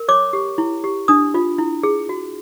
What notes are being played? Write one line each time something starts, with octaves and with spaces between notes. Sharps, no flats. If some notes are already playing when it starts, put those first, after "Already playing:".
Already playing: A#4
C#5 D6
G4
E4
G4
D4 D#6
F4
E4
G#4
F#4